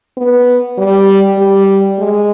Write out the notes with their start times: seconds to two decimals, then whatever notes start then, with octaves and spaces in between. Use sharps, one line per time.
0.18 B3
0.78 G3
1.38 G3
1.99 G#3